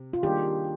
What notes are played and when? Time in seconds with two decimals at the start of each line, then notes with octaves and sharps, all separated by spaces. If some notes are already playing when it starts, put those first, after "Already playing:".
Already playing: C3
0.13 F4
0.23 D#3 G3 A#3 D4 G4 G#4